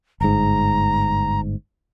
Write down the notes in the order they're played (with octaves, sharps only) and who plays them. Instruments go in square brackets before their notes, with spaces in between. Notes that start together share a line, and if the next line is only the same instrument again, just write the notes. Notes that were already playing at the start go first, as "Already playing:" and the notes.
[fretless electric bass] G1 G#2 [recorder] A#5